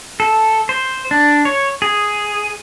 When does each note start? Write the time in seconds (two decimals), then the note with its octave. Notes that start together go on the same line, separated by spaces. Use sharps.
0.20 A4
0.69 C5
1.11 D4
1.45 C#5
1.82 G#4